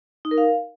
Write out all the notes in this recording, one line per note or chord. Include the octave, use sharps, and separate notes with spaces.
D#4
A#4
F5